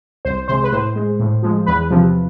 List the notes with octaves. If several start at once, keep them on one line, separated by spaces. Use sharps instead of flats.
C2 C5
C3 G#3 C5
B4
A2 C5
G#3
A2
F3 G#3
E2 B4
C3 F3